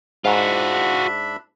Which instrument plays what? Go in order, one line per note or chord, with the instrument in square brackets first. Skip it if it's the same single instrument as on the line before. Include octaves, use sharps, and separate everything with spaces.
[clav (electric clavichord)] G#2 [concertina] D4 E5 B5 [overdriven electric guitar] F4 F#4